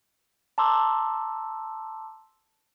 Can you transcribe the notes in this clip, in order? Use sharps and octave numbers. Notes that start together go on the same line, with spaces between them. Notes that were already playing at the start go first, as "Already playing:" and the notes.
A5 A#5 C6 D6 E6